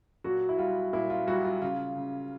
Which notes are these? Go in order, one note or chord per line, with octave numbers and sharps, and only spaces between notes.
A#2 F#3 F#4
E4
G3 F4
A#2 E4
F4
F#3 G3 F#4
F4
C#3 F4
C#3